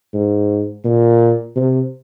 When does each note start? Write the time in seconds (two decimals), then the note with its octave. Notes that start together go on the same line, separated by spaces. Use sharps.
0.14 G#2
0.85 A#2
1.56 C3